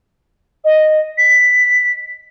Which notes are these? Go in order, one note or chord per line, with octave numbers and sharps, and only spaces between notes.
D#5
B6